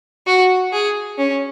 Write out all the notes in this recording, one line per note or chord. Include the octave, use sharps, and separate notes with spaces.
F#4
G#4
C#4